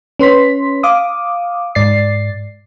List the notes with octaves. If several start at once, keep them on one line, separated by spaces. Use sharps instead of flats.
C#4 B4 C6 B6
F5 D6 D#6
G#2 D5 A6 C7